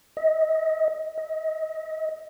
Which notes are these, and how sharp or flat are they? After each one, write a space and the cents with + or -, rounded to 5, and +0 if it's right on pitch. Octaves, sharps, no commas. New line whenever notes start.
D#5 +30
D#5 +35